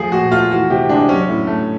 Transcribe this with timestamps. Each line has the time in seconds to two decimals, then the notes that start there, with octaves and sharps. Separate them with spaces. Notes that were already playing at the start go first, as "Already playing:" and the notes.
Already playing: F3 A3 G#4
0.12 A#2 F#4
0.31 A3 F4
0.51 E3 F#4
0.70 C3 G4
0.89 G#3 D4
1.09 F#3 C#4
1.28 A2
1.47 A3